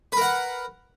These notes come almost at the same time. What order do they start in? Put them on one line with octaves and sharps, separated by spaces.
B4 A#4 F#5